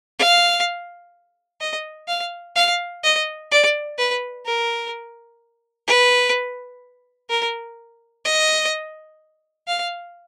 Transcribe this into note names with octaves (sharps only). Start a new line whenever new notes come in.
F5
D#5
F5
F5
D#5
D5
B4
A#4
B4
A#4
D#5
F5